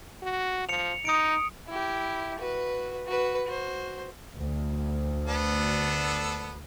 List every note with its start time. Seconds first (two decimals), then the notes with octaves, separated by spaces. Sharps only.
0.23 F#4
0.69 F3 C#7 F7
1.05 D#4 D#6 C#7 D7
1.68 E4 G4
2.39 F#4 B4
3.06 F#4 B4
3.47 F#4 C5
4.37 D2
5.27 B3 D4 A4